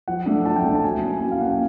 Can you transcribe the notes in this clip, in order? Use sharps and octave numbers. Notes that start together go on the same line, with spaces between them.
F3 F#5
A3 D4
F3 A5
G5
A3 D4
A5
F#3 G#5
A#3 C#4 E4
F#3 G5
F5
A#3 C#4 E4 F#5
G5